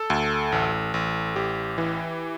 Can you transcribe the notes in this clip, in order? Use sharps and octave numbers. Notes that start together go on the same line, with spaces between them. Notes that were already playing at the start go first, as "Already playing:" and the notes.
Already playing: A4
D2
A1
A1
A1 G4
E3